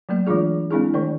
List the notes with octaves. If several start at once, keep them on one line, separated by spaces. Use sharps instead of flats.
F#3 A3 A#3 D5
E3 G#3 D4 F4 G#4
G#3 C4 D4 E4 G#4
D#3 A3 A#4 D5